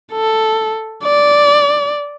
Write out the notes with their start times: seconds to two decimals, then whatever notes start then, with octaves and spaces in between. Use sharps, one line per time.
0.12 A4
1.04 D5